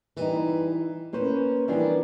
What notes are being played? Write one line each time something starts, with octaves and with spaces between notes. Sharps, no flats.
E3 G3 D#4
A#3 C#4 B4 C5
E3 F3 G3 A#3 B3 D4